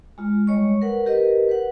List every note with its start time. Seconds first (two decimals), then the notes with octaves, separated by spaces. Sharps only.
0.18 G#3 F4
0.47 G3 G#3 C#5 D#5 C#6
0.82 A#4 B4 F#5
1.06 G4 A#4 B4 D#5
1.49 B4 F#5